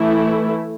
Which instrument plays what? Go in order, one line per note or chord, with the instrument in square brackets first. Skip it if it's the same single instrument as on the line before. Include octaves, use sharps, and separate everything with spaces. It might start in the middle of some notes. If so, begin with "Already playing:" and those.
Already playing: [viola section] E3 A3 E4